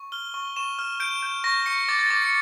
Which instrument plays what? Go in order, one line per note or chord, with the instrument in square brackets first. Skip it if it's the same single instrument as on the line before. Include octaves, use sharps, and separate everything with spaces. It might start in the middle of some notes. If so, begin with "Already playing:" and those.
Already playing: [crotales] C#6
F6 G7
C#6
C#6 E7
F6
G6 D7
G6
C#6 A#6
C#6 C#7
D6 A6
A6
D6 A6
C#7